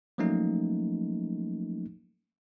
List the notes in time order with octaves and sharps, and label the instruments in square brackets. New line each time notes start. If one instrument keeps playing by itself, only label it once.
[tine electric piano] F3 F#3 A3 A#3 C#4 D#4